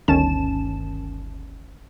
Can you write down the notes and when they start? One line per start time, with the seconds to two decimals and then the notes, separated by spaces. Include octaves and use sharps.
0.08 G1 D2 D#3 C#4 A5 E7